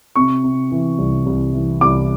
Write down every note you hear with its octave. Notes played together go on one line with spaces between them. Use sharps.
C3 C#6
C3
E3
C2
C2
E3
C2 D6